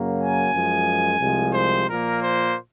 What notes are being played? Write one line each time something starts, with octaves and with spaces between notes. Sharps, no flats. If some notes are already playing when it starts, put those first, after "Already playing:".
Already playing: F#2 C#3 F#3 A#3
G#5
F#2 F3 G#3
C2 C3 F3 G#3
C5
A#2 F3 A#3 A#4
C5